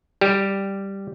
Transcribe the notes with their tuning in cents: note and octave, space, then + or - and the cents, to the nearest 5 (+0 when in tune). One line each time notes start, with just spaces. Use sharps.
G3 +0 G4 +0